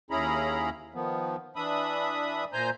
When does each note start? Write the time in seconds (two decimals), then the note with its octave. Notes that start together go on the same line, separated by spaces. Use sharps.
0.11 D#2 C#4 E4 G#4 A#5 B5
0.94 D#3 F3 B3
1.56 E3 D4 E5 B5 D#6
2.53 A#2 C5 G#5 A#5 G6